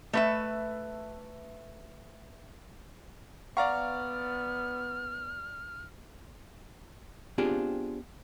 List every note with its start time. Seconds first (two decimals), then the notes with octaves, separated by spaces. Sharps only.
0.13 A3 B4 E5
3.57 B3 D5 F5 F#5 A#5 C#6 F6
7.38 B3 C4 D4 F4 G4 G#4